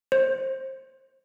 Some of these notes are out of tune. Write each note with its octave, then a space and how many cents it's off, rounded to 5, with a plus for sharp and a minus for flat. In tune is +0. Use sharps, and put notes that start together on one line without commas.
C5 +20